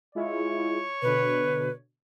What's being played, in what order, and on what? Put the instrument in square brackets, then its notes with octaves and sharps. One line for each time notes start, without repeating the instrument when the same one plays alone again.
[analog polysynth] G#3 E4 F4 [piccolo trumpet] C#5
[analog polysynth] B2 D3 [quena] B4